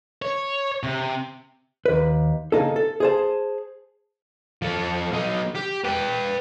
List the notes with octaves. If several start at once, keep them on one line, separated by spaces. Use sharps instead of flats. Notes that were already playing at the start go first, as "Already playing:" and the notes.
C#5
C3
D#2 B4
C#3 A#3 D#4 A4
A4
G#4 C5 A5
F3 A4
B1 D#4
G4
B4 G5